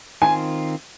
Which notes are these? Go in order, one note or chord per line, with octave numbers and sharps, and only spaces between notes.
D#3 C4 F4 G#5